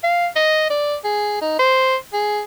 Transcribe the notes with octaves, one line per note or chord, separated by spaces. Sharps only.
F5
D#5
D5
G#4
D#4
C5
G#4